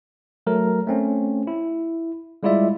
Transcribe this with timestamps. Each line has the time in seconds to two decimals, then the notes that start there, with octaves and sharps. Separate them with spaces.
0.47 F#3 A3 A#4
0.87 A3 C4 C#4
1.47 E4
2.43 G3 G#3 E4 F4 D5 E5